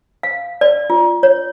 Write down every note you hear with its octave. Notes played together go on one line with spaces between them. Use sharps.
F5
D5
F4
C#5